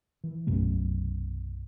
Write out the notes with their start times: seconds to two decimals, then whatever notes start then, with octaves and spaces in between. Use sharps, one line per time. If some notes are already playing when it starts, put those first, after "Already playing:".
0.24 E3
0.47 B1 F#2 C3 A3